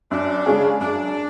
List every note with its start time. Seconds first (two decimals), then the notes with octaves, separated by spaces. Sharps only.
0.11 F#2 D4
0.46 C#3 G#3 C#4 G#4
0.80 F#2 D4